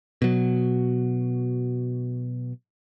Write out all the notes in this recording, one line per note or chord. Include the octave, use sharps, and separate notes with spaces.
B2 F#3